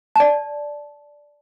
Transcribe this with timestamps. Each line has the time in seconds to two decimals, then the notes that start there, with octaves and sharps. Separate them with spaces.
0.16 D5 A5